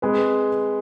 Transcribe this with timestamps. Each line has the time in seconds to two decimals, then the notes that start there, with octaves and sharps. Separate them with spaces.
0.02 G#3 C4 G#4 B4